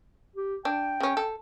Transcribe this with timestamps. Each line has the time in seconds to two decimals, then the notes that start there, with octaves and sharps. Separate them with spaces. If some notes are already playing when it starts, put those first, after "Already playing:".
0.36 G4
0.65 D4 G5
1.00 C#3 C#4
1.17 A4